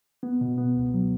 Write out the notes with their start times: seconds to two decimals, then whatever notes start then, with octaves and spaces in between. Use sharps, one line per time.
0.23 B3
0.41 B2
0.58 B3
0.76 C#2
0.94 F#3